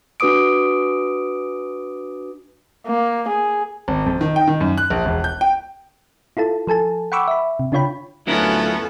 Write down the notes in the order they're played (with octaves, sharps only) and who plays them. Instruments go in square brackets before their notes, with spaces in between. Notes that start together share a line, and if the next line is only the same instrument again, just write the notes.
[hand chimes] D4 F#4 B4 D6 D#6 D7
[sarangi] A#3
G#4
[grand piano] G#1
F2
D#3
G5
D#3
F#2
F#6
A#1
E1
G6
G5
[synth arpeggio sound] E4 F4 A4 A5
F3 A4 G#5 A5
F#5 G5 B5 C#6 D6 E6
E5 B5
C3
C#3 D4 F4 C#5 G5 B5
[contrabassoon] D2 [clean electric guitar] F#3 E4 A#4 [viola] B3 C#4 [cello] F4 A4